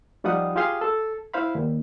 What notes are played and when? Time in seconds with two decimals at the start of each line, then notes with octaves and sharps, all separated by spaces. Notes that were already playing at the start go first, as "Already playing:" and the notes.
0.24 F3 G3 D#4 F4 F#5 D#6
0.56 F4 G4 G#4 F5 C6 D#6
0.81 A4
1.34 E4 C5 F5 B5
1.55 D#2